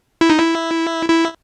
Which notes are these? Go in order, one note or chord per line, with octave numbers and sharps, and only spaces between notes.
E4
D#4
E4
E4